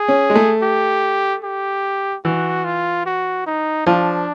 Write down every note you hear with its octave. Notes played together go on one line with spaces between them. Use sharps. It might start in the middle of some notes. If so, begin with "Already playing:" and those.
Already playing: G#4
C#4
G#3
A3
G4
G4
E3 F#4
F4
F#4
D#4
F3 D4